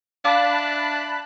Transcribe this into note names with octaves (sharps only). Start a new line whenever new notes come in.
D4 E5 F5 A5 B5 D6 F#6